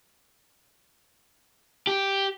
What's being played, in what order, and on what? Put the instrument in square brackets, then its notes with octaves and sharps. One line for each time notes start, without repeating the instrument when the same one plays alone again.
[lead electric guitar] G4